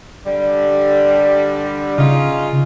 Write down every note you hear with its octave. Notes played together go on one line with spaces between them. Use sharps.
D3 G3
C#3 C#4 D#4 F4